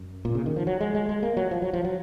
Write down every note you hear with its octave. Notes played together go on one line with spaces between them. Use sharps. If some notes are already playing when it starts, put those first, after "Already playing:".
Already playing: F#2
A#2
C#3
D#3
F3
F#3
G#3
G#3
G#3
A#3
F#3
F3
F#3
F3
F#3